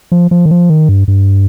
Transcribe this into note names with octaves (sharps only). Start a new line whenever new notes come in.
F3
F3
D#3
F3
D#3
G2
G2